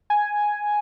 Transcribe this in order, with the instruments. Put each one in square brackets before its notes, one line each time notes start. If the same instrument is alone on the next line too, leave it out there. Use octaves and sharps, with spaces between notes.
[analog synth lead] G#5